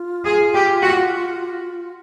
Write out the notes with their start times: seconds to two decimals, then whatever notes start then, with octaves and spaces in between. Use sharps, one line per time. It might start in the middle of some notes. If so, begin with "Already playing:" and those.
Already playing: F4
0.25 G#4
0.54 G4
0.82 F#4